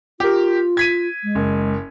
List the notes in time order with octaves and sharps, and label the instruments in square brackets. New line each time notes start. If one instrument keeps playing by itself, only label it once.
[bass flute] F4 [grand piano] G4 A#4
[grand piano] G#6 B6 D#7
[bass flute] G#3
[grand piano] F#1